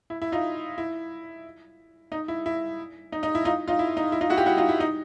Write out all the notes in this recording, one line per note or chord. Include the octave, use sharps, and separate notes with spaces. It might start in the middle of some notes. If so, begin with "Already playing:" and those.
E4
E4
D#4 F4
E4
D#4
E4
E4
D#4
D#4
E4
D#4 F4
D#4 F4
E4
D#4
E4
D#4 F4
E4 F#4
F4 G4
E4 F#4
D#4 F4
E4
D#4